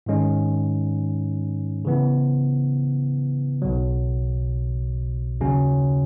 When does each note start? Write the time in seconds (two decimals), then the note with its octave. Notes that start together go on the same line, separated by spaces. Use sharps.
0.06 G#2 D#3 G#3 C#4
1.85 C#3 E3 B3
3.62 B1 B2 F#3
5.40 D#2 C#3 F#3 C#4